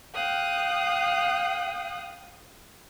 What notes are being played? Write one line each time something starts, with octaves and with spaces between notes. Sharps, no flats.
F5 G5 D#6 F#6